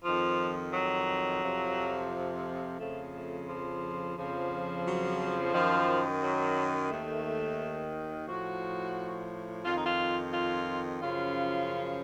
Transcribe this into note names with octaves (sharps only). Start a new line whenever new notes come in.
F2 D#3 F3
F#3
F2 C3 F3
F2 C#3 F3 A3
A3
F3
F2 C#3 F3
F#3
F#2 D#3 F3
F#3
D#2 D#3 A3
A2 F3 F#4
F2 D#3 F4
D#4
F4
F4
F#2 C#3 F3 F4